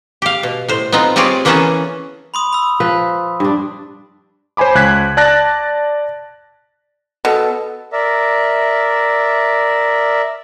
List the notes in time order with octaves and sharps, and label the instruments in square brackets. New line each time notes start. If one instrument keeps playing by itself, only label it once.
[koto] G4 F5
B2
A2 C5
B3 C4 D#4 F4
G3 C4 F4 G#4 C#5 D5
E3 A#3 B3 C#4 G#4 A4
[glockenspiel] B5 C6 D#6
B5 E6
[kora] F3 B4
G2 D4
[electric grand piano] C5 C#5 G#5 B5 D6
C#2 F#6 G#6 B6
D5 A5 F#6 A6 A#6
[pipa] B2 [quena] A4
[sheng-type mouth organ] A#4 D5 E5